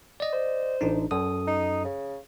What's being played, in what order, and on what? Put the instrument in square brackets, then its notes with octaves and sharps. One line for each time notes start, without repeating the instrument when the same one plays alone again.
[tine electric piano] D5 D#5
[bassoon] C5
[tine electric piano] A1 D4 D#4
F#2 A4 D#6
[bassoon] D#4
C#3